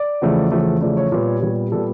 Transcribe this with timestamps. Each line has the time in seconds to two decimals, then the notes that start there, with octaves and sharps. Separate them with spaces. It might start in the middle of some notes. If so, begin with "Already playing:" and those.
Already playing: D5
0.22 E2 C#3 F3 A3
0.52 E2 C#3 F3 A3
0.81 E2 C#3 F3 A3 D5
0.97 C#5
1.12 A#2 G3 B3
1.42 A#2 G3 B3
1.71 A#2 G3 B3 A4